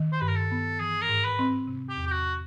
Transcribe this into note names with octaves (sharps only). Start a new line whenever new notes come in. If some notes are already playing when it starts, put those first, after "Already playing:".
Already playing: D#3
C5
G2 B4
A#4
A4
B3
E3 G#4
A#4
G#2
B4
C4
C3
G4
E2
G4
F#4